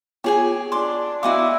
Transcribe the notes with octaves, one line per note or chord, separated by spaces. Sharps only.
B3 F4 G4 G#4 C#5 G#5
D4 C6 D6
B3 E4 F#4 D#5 F5 D6